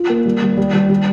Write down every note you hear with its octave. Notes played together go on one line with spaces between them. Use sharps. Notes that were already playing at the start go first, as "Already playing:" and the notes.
Already playing: F4
A#3
G3
G3
G3
G3
G3